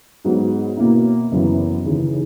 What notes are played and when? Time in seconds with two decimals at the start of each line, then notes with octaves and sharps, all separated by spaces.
0.25 G#2 F#3 B3
0.77 B2 A#3 C#4 E4
1.31 F#1 F#2 E3 B3
1.84 D#2 C#3 E3